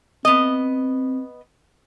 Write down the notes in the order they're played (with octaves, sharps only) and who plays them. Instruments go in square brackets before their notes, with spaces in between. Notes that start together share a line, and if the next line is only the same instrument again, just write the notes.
[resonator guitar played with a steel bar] B3 D#5 [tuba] C4